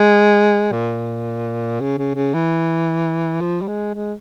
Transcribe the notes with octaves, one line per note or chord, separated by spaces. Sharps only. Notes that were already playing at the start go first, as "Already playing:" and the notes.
Already playing: G#3
A#2
C#3
C#3
C#3
E3
F3
G3
G#3
G#3